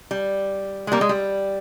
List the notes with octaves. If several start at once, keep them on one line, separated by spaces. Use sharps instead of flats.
G3
G#3
G3 A#3
G#3
G3